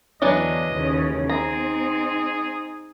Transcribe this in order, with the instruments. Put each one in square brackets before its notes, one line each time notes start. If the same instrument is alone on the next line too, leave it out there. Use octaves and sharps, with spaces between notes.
[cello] E2 D3 [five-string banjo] E3 F#3 D4 [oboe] D#5
[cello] D#2 C#3
[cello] C4 D#4 [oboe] G#4 [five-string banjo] A#5